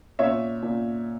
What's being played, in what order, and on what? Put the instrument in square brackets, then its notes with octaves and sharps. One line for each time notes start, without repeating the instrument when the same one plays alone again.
[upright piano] A#2 C#5 E5
A#2